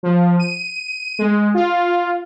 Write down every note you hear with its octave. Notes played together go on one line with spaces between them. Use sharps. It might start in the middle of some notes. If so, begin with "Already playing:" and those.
F3
D#7
G#3
F4